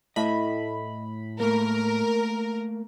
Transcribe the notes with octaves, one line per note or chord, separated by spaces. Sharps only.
A2 D#5 E5 B5
A3 A#3 A#4